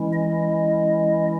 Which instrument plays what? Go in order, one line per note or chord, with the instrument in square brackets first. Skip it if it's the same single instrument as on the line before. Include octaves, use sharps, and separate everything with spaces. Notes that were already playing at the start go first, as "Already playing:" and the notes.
Already playing: [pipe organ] E3 G#3 C#4 E4
D#5